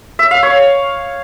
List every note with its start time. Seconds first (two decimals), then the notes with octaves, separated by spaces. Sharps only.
0.19 E5
0.31 F5
0.43 C#5